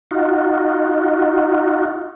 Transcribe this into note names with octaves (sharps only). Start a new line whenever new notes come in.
D#4 F4 F#4